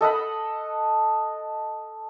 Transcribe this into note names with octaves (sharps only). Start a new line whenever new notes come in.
A4 D#5 F#5 B5